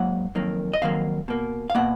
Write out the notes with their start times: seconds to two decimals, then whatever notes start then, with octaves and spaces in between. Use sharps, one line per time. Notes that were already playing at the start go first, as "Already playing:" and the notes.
Already playing: G#2 F#3 A#3 F#5
0.35 F2 D#3 F#3 A#3
0.73 D#5
0.81 F2 D#3 F#3 A#3 F5
1.28 B2 A#3
1.70 F5
1.75 B2 A#3 F#5